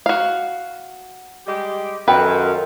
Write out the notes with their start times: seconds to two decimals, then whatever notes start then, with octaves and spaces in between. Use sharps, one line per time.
0.06 F#4 F5
1.46 G3 G#3 G4
2.08 F#2 D#3 F4 A4 B4 G5